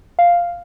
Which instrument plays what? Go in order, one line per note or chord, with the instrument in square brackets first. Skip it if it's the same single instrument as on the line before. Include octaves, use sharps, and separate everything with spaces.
[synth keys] F5